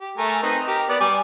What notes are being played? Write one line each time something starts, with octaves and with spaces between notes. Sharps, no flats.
G4
A3 A#4 G#5
C4 D#4 B4
G4 A#4
B3 D5
G3 G#5 D6